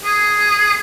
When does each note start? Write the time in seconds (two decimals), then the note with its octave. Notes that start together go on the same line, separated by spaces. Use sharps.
0.05 G#4